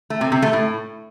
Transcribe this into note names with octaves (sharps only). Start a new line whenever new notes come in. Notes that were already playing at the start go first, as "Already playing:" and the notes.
A3
C3
C3
A3
A2